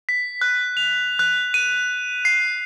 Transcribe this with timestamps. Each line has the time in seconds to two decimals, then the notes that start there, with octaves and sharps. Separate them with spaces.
0.09 B6
0.41 F#6
0.77 F7
1.19 F#6
1.54 D#7
2.25 C7